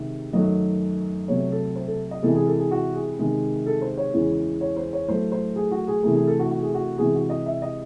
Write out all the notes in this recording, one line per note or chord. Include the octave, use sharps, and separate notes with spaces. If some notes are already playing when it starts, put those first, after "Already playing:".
Already playing: C3 D#3 G#3
F#2 D#3 F#3 A3 D#5
C3 F#3 A3 C#5
A4
C5
A4
D#5
C3 E3 G#3 A4
G#4
A4
G#4
F#4
G#4
C3 D#3 G#3
A4
C5
C#5
E2 C#3 E3 G#3
C#5
C5
C#5
A2 F#3 A3 C5
C5
G#4
F#4
G#4
C3 E3 A3 G#4
G#4
A4
F#4
F#4
G#4
F#4
C3 E3 G#3 G#4
F#4
D#5
E5
D#5